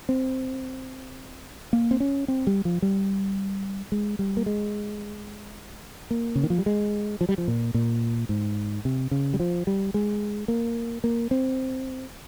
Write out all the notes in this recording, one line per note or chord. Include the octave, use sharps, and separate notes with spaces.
C4
A#3
C4
C#4
C4
G3
F3
G3
G#3
G3
A#3
G#3
A#3
C#3
D#3
F3
G3
G#3
F3
G3
F3
A#2
A#2
G#2
C3
C#3
G3
F3
G3
G#3
A#3
A#3
C4